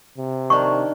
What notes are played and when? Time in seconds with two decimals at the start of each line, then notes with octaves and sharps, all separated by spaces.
0.18 C3
0.50 D#3 D4 A#4 C#6